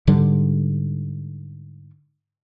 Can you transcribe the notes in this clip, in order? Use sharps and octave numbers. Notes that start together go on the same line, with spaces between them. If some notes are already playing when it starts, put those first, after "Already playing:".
G#2 D3 G3